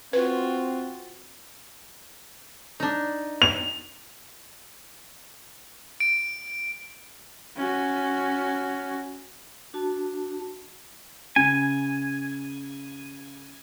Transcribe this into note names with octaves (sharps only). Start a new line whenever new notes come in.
C4 F4 F#4 B4
D4 D#4
F7
D7
C#4 F#4
D4 F#4 A5
C#3 G#5